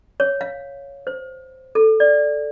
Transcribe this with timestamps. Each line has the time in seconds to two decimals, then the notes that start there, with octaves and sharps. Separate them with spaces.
0.20 C#5
0.41 F5
1.07 C5
1.75 A4
2.00 D5